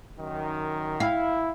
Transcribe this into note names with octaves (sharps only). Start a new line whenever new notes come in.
F#2 D#3
E4 F5